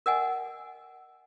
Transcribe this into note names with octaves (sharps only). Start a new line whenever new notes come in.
A#4 D#5 F#5 G#5